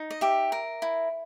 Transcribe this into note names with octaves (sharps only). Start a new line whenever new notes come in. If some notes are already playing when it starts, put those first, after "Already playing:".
Already playing: D#4
D#5
G4 E5
A#4
E4